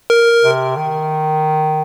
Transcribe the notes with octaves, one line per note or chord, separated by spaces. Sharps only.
A#4
C3
D#3